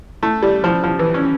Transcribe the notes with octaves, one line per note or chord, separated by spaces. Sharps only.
A3
G3
F3
F3
E3
C#4